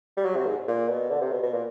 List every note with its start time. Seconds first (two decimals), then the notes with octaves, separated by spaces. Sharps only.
0.17 G3
0.25 F#3
0.36 C3
0.46 G#2
0.68 A#2
0.89 B2
1.10 D3
1.21 C3
1.32 B2
1.43 B2
1.53 A#2